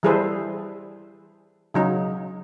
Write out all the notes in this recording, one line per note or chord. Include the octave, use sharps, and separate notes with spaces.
E3 G3 G#4 A4 B4 C5
C#3 F#3 D#4